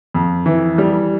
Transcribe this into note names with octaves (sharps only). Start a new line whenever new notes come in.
F2
E3
G3